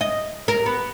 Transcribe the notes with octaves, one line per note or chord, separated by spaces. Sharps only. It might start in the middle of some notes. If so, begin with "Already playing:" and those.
D#5
A#4
B3